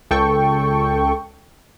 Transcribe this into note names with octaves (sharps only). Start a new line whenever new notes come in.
C#2 A4 G5 C#6